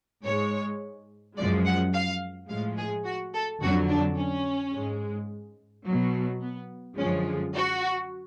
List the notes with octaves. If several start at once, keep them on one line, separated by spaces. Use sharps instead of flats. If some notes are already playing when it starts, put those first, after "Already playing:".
G#2 G#3 C#5
F#2 F3 G#3 D5
F#5
F5
A2 F3 G#3 F5
G#4
F#4
A4
F2 D3 F#3 F#4
D4
C#4
G#2 G#3
B2 F#3
B3
F#2 D3 F3 G#3 C#4
F#4